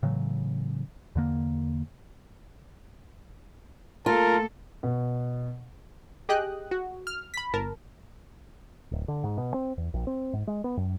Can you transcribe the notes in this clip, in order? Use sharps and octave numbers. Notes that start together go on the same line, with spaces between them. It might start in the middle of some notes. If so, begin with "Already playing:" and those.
A2 C#3 E3 F#3
E2 D3 A#3
A3 A#3 F4 A4 A#4 A5
B2
G4 G#4 D#5 G5 D#6 F#6
F#4
F6
B5 B6
G1 A#4 A5
D1
D3
G#2
B2
C4
E2
A#1
C4
G#2
G#3
B3
F#2